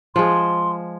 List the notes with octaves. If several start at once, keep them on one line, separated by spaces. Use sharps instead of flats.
F3 G#3 C6